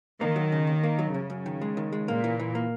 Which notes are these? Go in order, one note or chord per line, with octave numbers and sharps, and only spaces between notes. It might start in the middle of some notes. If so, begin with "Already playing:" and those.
D#3 A#3
F#3
C#3
D#2
A#3
F#3
F#2 C#3
F#2
D#3
G#3
D#3
G#3
A#2 A#3
E3
E3
A#3